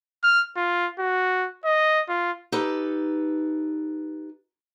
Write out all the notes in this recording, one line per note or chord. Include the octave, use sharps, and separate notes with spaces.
F6
F4
F#4
D#5
F4
D#4 G4 A4 B4